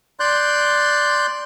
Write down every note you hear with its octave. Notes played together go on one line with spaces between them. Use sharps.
D5 C6 F#6 G6